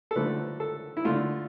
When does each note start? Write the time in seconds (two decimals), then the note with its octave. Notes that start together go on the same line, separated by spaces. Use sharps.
0.11 A4
0.16 D3 F3 A3 B4
0.60 A4
0.97 E4
1.05 D3 A3 F4